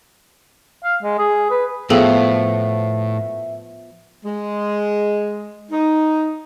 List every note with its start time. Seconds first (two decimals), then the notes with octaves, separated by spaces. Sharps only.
0.83 F5
1.03 G#3
1.18 G#4
1.50 B4
1.90 A2 F3 B3 G#4 A4 E5 G5
4.25 G#3
5.71 D#4